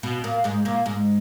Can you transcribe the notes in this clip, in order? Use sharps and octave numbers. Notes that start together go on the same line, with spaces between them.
B2 B3
A#2 A#3
G#2 G#3
A#2 A#3
G#2 G#3